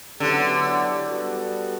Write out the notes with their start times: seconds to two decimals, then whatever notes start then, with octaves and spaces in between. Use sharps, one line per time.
0.20 D3 F#3 B3 E4 G4
1.07 G3 B3 F#4 A4